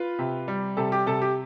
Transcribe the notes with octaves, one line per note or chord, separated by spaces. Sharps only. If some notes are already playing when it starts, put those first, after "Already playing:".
Already playing: F4 B4
C3
G3
C3 A4
G4
C3 A4
G4